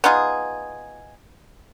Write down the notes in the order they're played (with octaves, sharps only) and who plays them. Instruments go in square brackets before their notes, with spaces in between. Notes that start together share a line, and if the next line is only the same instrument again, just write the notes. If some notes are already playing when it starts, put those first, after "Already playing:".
[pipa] B3 D#4 F4 G#4